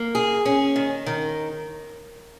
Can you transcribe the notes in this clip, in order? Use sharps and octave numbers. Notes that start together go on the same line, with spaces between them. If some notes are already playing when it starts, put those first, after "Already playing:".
Already playing: A#3
G#4
C#4
D#3
D#3